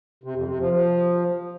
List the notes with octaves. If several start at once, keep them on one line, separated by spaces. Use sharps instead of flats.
C3
F2
C3
F3
F3